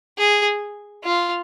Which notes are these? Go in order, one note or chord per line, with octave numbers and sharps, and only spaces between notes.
G#4
F4